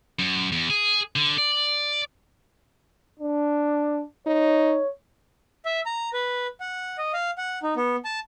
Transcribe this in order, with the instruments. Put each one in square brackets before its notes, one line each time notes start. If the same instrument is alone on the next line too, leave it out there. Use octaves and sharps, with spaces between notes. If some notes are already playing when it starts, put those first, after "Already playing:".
[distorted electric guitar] F#2
E2
G#4
D3
D5
[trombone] D4
[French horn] D#4 [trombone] C#5
[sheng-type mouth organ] E5
A#5
B4
F#5
D#5
F5
F#5
D#4
B3
A5